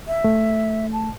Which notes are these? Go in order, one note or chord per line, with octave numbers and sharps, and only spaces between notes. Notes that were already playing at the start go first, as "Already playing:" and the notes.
E5
A3
A5